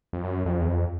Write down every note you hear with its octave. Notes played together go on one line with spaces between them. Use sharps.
F2
F#2
F2
E2
F2